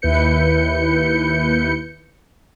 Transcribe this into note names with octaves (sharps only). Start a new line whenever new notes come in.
D#2 E4 B4 G6 C#7